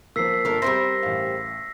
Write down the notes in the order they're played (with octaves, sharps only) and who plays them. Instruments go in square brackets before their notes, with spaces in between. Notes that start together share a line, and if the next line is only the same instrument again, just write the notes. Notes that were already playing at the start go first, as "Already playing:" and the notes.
[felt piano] F3 A#3 [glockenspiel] E6 B6 C7
[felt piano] G1 A#3 [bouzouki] A4 A#4
[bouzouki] G3 A#4 C5 [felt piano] C4 E5 [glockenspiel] E6 A#6
[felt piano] A1 F5